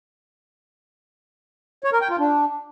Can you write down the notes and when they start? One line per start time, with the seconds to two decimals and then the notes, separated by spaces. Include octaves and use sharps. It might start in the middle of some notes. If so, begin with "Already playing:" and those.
1.84 C#5
1.93 A#4
2.01 G5
2.10 F4
2.19 D4